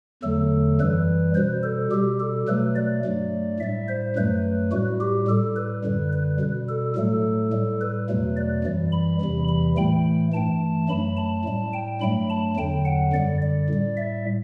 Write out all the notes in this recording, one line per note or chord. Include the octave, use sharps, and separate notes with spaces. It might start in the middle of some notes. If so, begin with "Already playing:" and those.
E2 D3 F#3 A3 A4
F#2 E3 G3 B4
B2 G3 C5
A4
B2 G3 G4
A4
B2 F#3 A3 B4
D5
G2 F#3 A3
A2 G3 E5
C5
F#2 F#3 A3 B4
A2 G3 F#4
G4
A2 G3 A4
B4
F#2 D3 G3
B4
B2 G3
A4
A2 F#3 A3 A4
A2 G3
B4
E2 B2 F#3 A3
D5
F#2 E3 G3
B5
E2 C3 E3 G3
B5
A2 E3 A3 G5
G2 E3 A3 A5
F#2 F#3 A3 B5
A5
A2 G3
G5
G2 F#3 A3 B5
A5
E2 D3 F#3 G5
F#5
F#2 D3 G3 D5
D5
A2 G3
E5